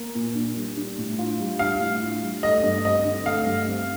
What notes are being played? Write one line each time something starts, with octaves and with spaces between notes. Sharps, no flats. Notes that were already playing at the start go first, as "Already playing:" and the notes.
Already playing: A#3
A#2
D4
G3
D4
A2
F4
G3
D4 F5
A2
F4
G3
A3 D#5
G2
C4 D#5
D3
A3 F5
G2
C4